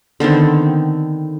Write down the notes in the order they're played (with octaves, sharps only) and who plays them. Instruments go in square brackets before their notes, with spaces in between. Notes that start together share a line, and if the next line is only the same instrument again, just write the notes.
[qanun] D3 D#3 B3 C4